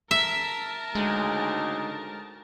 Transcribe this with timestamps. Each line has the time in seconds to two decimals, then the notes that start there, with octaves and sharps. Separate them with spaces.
0.11 A#4 E5 A5
0.95 D2 G#2 C#3 G#3